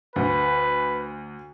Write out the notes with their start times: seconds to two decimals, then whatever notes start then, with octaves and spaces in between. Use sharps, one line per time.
0.16 D2 B4